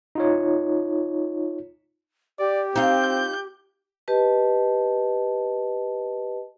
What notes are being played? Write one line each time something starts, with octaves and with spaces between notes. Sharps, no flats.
D#4 F4 C#5
G4 D5
C4 D#4 F4 G6
G4 B4 D#5 A5